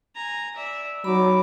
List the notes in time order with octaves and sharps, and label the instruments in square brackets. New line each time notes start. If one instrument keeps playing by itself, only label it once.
[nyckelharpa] G#5 A#5
D5 E5
[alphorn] F#3 [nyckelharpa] D#4 D6 [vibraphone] B5